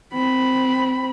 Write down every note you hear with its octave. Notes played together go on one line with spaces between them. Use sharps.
C4 B5